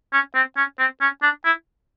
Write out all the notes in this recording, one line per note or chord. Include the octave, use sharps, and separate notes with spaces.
C#4
C4
C#4
C4
C#4
D4
E4